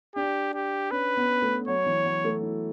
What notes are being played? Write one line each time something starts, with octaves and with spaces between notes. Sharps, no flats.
D4 G4
G4
C#4 B4
B3
A3
F#3 C#5
E3
F#3
A3
E4